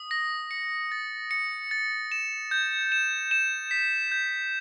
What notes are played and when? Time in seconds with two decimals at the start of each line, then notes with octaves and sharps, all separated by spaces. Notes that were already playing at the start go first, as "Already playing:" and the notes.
Already playing: D#6
0.11 A#6
0.51 C#7
0.92 A6
1.31 C#7
1.71 A6
2.12 E7
2.51 G6
2.92 E7
3.31 E7
3.71 B6
4.12 G6